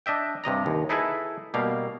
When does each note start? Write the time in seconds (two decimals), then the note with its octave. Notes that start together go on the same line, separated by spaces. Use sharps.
0.06 D4 D#5 E5 G5
0.44 G2 C3 D#5 A#5
0.66 D#2
0.89 D#4 E4 G#4 A4 B4 E5
1.54 B2 G3 A#3 F5